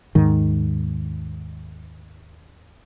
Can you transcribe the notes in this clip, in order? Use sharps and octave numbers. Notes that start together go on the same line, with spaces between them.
D#2 G#2 D#3